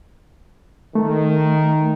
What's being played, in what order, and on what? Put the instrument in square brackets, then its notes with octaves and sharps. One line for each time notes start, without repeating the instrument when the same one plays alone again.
[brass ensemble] D#3 [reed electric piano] A3